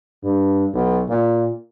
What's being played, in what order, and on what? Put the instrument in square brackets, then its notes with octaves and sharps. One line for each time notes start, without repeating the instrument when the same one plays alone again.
[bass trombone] G2
B1
A#2